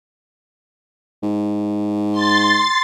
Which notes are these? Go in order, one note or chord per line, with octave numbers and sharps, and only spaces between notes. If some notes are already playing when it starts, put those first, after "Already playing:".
G#2
C6 A6